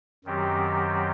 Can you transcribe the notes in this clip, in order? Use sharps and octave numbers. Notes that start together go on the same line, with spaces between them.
F#2 D#3 F#3 C4 G4